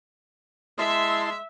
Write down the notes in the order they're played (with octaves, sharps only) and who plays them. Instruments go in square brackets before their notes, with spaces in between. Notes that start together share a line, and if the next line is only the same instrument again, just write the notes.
[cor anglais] G#3 [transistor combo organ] E4 A5 C6 [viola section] E5